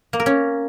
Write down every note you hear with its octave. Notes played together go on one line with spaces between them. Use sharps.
A#3
A#4
C#4